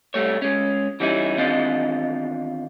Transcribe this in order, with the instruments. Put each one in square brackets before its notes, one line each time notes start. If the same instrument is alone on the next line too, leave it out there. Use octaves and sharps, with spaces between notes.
[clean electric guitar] C2 G3 A3 C#5
G#3 C#4
E3 G3 C#4 D#4 E4
E2 D#3 C4 D4 F4 D#5